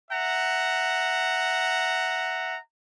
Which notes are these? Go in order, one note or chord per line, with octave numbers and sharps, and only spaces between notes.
E5 F#5 A#5